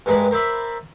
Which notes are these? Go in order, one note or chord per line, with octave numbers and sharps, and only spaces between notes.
G2 G#3 A#4 B4
A#4 C5 D5 E5 B5